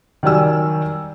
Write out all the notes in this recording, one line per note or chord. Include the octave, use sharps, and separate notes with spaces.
D#3 F#3 G3 D5 G#5 E6